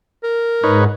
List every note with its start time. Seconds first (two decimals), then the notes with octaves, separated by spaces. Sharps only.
0.24 A#4
0.63 G#2 D#4 B4 C#5